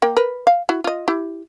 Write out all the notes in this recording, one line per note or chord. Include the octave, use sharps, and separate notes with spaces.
A#3 G5
A#4 B4
F5
E4 F#4
F4 D#5
E4 G4